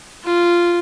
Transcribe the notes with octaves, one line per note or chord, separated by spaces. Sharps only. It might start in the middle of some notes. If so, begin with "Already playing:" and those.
F4